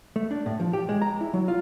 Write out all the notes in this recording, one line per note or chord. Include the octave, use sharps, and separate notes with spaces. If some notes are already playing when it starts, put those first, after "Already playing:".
A3
D4
A2
F3
G4
G#3
A#5
E4
F#3
F4